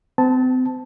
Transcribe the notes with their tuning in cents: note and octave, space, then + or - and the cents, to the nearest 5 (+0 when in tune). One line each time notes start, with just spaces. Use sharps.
C4 -40 A5 +0